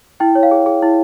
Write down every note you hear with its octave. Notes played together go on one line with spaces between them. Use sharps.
E4 G5
C#5
F5
G#4
G#4
E4